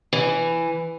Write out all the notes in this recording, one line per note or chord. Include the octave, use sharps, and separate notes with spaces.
E3